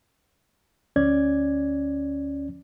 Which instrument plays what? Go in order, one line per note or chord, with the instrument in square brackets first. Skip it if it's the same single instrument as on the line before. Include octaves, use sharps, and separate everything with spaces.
[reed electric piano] D2 C#4 D5 G#6